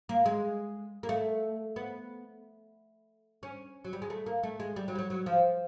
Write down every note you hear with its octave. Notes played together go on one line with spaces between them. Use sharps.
A#3
G#3
A#3
A3
B3
C#4
F#3
G3
G#3
A3
A#3
A3
G#3
G3
F#3
G3
F#3
F#3
F3